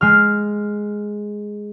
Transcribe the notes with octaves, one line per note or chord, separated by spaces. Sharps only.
G#3 F6